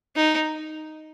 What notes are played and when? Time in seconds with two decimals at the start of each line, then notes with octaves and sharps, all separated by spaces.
0.16 D#4